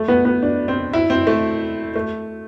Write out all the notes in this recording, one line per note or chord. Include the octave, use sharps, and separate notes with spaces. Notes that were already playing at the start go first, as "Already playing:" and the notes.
Already playing: A3
B3
B3
D4
C4
E4
C4
A3
A3